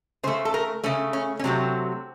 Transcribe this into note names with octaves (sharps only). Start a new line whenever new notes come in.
C#3 A3 C5
A4
A#4
C#3 A3 C#4
C#4
C#4
C3 F#3 A3 C4